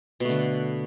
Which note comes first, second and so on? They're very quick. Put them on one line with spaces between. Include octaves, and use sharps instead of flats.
B2 A3 D3